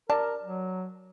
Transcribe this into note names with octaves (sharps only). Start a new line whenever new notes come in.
A#4 D5 A5
F#3